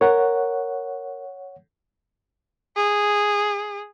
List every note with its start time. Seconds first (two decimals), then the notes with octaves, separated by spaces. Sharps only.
0.01 A#4 C#5 F#5
2.76 G#4